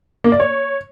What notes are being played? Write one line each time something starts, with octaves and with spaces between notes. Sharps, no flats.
A#3
D5
C#5